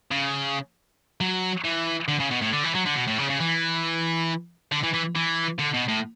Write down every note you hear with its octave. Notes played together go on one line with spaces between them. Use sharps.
C#3
F#3
E3
D3
C#3
B2
A2
D3
E3
F#3
D3
B2
A2
C#3
C#3
E3
D3
E3
E3
E3
D3
B2
A2